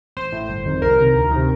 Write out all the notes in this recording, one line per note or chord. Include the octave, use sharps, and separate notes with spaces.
A1 C5
A2
G1
F2 D#3
C2 A#4
C3 D#3
D2
C3 D#3